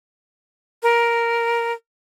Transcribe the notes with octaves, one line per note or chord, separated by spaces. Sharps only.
A#4